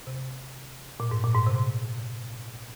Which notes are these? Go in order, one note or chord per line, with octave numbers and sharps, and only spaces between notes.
C3
A#2
G#2
A#2
G#2
C3